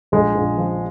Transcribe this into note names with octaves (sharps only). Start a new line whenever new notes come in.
A#1 G#3
A#1
F3